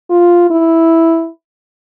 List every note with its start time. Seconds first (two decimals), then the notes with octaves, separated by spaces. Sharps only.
0.10 F4
0.51 E4